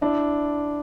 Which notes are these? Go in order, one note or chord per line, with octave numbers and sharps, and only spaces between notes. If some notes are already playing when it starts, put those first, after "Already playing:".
D4 E4